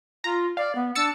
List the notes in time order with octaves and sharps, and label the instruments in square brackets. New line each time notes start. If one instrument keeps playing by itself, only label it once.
[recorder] F4 [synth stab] A#5
[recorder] D5 [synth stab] F5
[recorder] B3
[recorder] D4 [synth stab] E6 A6 C#7